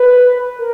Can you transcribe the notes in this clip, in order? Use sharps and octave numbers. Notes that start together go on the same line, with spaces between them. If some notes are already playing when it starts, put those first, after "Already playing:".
Already playing: B4
A#4